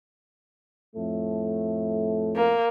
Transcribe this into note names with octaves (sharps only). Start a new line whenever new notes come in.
F2 A2 A3
A#3